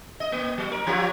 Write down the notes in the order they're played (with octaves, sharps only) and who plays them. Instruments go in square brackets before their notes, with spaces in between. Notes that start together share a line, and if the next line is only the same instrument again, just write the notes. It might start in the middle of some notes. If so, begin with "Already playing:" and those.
[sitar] D#5
A#3
F#3
A#4
F3 F4 G4